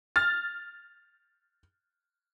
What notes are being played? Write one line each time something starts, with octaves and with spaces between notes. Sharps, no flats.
F6 A6